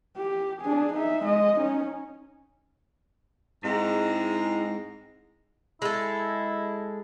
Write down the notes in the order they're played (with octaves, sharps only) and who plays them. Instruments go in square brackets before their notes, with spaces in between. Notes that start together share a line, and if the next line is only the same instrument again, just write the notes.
[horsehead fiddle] G4
D4 G#4
D#4 E5
G#3 D#5
C#4 D#4
[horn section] G#2 G#3 [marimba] C4 G#4 [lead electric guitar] E4 G5 [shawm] A#5
[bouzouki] G#3 A4 [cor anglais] E4